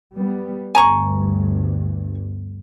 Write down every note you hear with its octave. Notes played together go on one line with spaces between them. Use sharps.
G3 B3
G1 D2 G2 G#5 A#5 C#6